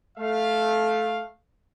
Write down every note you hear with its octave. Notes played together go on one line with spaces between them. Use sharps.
A3 F5